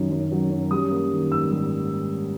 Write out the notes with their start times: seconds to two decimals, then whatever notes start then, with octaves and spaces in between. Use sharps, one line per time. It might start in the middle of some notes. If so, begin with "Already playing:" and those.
Already playing: F#2 D#3 F#3
0.10 F#2
0.32 F#3
0.51 F#2
0.71 G3 D#6
0.91 A#3
1.12 D#3
1.32 G#2 E6
1.51 G3